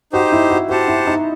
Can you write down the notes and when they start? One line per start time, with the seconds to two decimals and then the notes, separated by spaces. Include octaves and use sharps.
0.13 D#4 F#4 G4 C5
0.32 E4
0.50 F#4
0.69 F#4 G4 C5 F#5 A5
0.88 E4
1.07 D#4